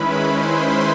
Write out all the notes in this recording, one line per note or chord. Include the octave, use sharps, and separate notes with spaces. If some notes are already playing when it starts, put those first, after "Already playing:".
Already playing: D#3 G#3 C#4 E4 B4 B5
C5 C6